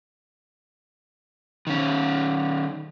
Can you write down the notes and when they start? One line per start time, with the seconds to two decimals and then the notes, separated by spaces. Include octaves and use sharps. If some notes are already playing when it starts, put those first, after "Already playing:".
1.67 D#3 C#4